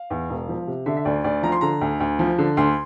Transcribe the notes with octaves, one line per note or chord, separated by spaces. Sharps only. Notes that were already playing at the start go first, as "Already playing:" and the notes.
Already playing: F5
E2
E1
F3
C3
D3 E5
E5
D2 D5
D2 D5
F3 A#5
C6
D3 A#5
D2
D2
F3
D3
D2 C6